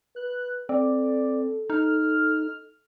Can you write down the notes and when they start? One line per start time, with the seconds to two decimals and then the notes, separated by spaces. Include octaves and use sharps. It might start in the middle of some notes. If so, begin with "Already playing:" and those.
0.16 B4 F#6
0.69 C4 A4 D5
1.70 D#4 F6